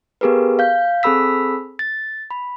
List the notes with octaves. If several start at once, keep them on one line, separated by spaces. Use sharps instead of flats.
B3 G4 G#4 A#4 B4
F5 G6
C4 G#4 A4 B5 E6 B6
A6
B5